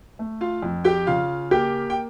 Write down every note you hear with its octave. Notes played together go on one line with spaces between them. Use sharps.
A3
F4 F5
F2
G4 G5
C#3 F4 F5
A#3 G4 G5
G5